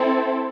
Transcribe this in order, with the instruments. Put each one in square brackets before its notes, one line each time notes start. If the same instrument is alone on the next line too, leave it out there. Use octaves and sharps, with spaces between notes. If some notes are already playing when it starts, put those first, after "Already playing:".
Already playing: [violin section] C4 E4 A4